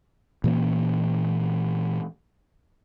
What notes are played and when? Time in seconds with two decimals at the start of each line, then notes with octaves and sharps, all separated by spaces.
0.44 A#2 E3 A#3 C#4